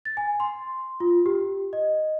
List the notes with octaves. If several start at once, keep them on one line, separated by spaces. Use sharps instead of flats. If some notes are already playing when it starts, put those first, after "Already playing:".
A6
G#5
C6
F4
G4
D#5